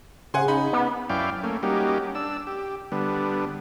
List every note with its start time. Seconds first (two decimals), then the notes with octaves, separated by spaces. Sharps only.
0.34 C#3 F#5 G#5 C6
0.48 D#4 B5
0.73 B3
1.10 F#2 C#4 E4 D5 F5 G5
1.43 A3 A#3 C#4
1.63 G3 A#3 C#4 D#4 F#4 G4
2.15 D4 E6
2.47 G4
2.92 D3 G3 B3